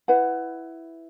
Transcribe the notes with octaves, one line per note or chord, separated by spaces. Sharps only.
E4 B4 F#5